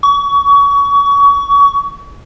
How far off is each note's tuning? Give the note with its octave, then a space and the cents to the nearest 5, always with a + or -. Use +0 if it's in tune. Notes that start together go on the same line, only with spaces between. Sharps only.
C#6 +30